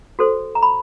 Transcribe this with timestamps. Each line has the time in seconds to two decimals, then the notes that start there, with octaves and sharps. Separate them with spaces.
0.19 F#4 A4 C5
0.55 A#5
0.62 B5